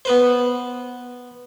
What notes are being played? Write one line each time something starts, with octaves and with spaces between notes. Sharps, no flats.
B3 B4 C5